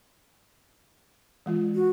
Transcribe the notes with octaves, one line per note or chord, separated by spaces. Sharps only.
E3 G#3 F4
F#4